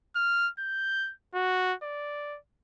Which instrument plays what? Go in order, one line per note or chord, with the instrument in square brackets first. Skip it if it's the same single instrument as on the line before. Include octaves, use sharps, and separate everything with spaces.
[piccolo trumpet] F6
G6
F#4
D5